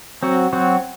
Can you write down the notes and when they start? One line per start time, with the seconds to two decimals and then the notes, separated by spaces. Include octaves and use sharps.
0.23 F#3 C4 F#4
0.53 F#3 C4 F#4